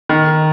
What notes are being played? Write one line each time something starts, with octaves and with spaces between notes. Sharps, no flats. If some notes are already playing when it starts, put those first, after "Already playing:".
D#3